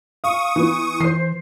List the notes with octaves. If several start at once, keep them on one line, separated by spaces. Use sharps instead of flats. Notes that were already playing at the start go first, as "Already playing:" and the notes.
F5 C#6 D#6
E3 B3
E3 C5 C7